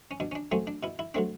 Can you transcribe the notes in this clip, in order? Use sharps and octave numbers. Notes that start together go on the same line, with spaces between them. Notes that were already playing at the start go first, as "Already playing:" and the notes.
C#4
B2 D4
C#4
D4
F#3 A3 C4 C#4
D4
B2 E4
E4
F#3 A3 C4 D4